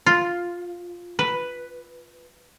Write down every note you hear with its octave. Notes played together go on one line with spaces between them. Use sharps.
F4
B4